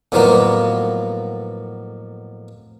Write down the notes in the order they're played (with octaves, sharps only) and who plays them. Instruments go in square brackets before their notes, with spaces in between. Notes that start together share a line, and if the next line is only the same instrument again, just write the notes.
[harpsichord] F2 A2 F3 F#3 A#3 B3